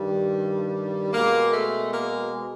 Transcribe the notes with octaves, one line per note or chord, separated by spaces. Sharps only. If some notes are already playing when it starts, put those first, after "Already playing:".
Already playing: G2 D#3 G3
B2 G#3 A#3
A3
A#3